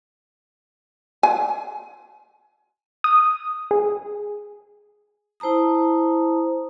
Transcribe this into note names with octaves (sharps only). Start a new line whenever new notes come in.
G#5
D#6
G#4
E4 C5 A5 A#5 D#6